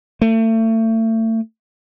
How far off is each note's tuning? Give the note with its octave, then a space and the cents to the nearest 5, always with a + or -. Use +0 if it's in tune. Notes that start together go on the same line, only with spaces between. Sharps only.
A3 +35